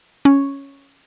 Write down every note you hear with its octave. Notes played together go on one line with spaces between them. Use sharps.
C#4